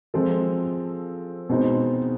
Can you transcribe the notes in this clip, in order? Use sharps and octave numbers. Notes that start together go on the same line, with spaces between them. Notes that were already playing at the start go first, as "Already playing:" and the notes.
F3 G#3 C4 F4 A4
B2 G#3 C4 D#4